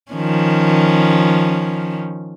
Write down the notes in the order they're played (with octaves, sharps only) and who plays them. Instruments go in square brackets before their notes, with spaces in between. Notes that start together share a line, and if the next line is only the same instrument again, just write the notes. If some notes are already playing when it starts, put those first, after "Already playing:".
[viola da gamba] D#3 F3 C#4